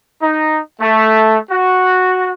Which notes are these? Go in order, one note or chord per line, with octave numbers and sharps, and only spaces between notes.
D#4
A3
F#4